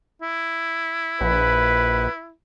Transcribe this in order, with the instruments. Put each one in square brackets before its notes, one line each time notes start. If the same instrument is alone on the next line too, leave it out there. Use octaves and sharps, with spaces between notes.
[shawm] E4
[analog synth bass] A#1 [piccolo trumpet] B4